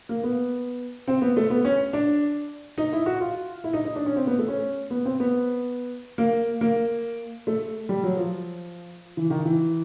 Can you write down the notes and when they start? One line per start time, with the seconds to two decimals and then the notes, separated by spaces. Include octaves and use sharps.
0.09 A#3
0.23 B3
1.08 C4
1.22 B3
1.37 A3
1.50 B3
1.65 C#4
1.93 D4
2.78 D#4
2.93 E4
3.06 F#4
3.21 F4
3.64 E4
3.73 D#4
3.85 D#4
3.96 D4
4.06 C#4
4.16 C4
4.27 B3
4.38 A3
4.48 C#4
4.90 B3
5.05 C4
5.20 B3
6.18 A#3
6.61 A#3
7.47 A3
7.89 G3
8.03 F#3
8.17 F3
9.17 E3
9.30 D#3
9.45 E3